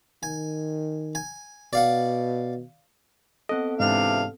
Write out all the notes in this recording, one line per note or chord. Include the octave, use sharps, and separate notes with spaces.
D#3 G#5
G#5
B2 D5 F5 F#5
B3 C4 A4 D#5 F#5
G#2 C3 E3 D4 F5